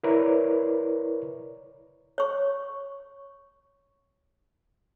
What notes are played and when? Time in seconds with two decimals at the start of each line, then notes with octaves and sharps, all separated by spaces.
0.03 E4 A#4 B4 C#5 D5
2.18 C#5 C#6